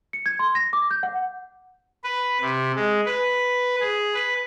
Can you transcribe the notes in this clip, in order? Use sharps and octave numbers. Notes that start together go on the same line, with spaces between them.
C#7
G#6
C6
A#6
D6
G6
F#5
B4
C3
G#3
B4
G#4
B4